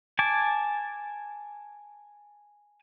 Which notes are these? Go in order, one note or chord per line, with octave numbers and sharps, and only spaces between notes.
G#5 A5 D6